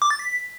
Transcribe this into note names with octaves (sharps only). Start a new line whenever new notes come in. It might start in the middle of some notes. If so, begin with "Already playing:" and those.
D6
A6
B6